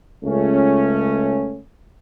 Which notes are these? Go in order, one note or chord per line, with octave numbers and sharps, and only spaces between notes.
C#2 A3 C#4